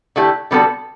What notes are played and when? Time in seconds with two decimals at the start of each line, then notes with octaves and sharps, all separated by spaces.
0.16 D3 A3 E4 G4
0.51 D3 G3 B3 F#4 A4